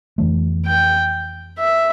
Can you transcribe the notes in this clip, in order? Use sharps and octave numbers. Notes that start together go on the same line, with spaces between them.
F2 E3 A3
G5
E5